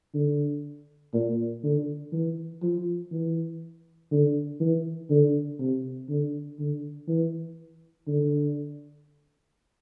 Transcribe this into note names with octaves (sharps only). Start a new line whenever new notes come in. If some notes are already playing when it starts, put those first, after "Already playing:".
D3
A#2
D3
E3
F3
E3
D3
E3
D3
C3
D3
D3
E3
D3